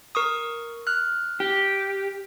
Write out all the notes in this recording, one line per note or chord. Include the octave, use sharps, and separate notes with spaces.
A#4 C#6 D#6
F6 F#6
G4